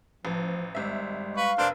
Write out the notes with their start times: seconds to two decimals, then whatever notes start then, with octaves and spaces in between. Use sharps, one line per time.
0.25 A1 F3
0.75 G#1 G3 G#3 E5
1.37 B4 F5 C#6
1.58 F1 D4 A#4 C5